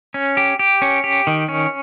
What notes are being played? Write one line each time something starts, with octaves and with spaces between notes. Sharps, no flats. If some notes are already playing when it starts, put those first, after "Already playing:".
C#4
G4
G4
C#4
G4
D#3
C#4